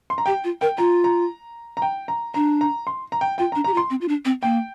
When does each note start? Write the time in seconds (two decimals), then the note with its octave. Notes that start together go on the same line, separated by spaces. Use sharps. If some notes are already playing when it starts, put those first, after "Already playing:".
0.10 C6
0.18 A#5
0.26 G4 G5
0.44 F4
0.61 A#4 G5
0.78 F4 A#5
1.04 A#5
1.77 A#5
1.82 G5
2.08 A#5
2.34 D4 A#5
2.61 A#5
2.87 C6
3.12 A#5
3.21 G5
3.38 F4 G5
3.52 D4 A#5
3.64 G4 A#5
3.74 F4
3.77 C6
3.90 C4
4.01 F4
4.08 D4
4.25 C4
4.42 A#3 G5